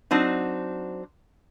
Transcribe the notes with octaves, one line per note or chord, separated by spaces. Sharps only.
F#3 C4 D4 D#4